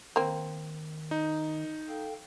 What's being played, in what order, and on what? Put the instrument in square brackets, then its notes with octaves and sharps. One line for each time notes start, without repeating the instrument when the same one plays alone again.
[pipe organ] D#3 [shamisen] A#3 C4
[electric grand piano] D#4
[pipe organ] A4 F5 G5